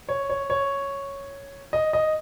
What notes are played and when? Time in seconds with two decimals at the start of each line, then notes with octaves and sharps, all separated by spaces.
0.09 C#5
0.30 C#5
0.50 C#5
1.73 D#5
1.93 D#5